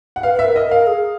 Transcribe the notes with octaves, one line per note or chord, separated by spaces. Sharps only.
F#5
B4 F5
B4 E5
A#4
D#5
A#4
F5
G#4